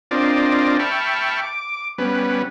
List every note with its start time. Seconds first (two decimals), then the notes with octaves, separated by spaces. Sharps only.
0.11 C4 D4 F4 A#4 D5 D#5
0.79 E5 G5 A5 B5 C#6 F6
1.42 D6
1.98 G3 B3 C#4 B4